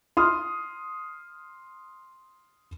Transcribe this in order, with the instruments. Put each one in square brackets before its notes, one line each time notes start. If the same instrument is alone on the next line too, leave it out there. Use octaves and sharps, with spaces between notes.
[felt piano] C6 D#6 F6